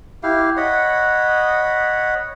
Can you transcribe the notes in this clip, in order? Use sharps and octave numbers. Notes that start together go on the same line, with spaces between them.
E4 G4 F5
C#5 D#5 F#5 B5